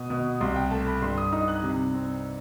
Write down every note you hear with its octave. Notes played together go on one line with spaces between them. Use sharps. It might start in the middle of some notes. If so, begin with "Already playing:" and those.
Already playing: B2 D#6
B2
C2 C6
G5
A3 A5
B5
G2 C6
D#6
D#4 D#6
F#6
C3
C4